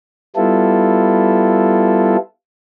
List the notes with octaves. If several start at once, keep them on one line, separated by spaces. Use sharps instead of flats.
G3 B3 E4 F4 A4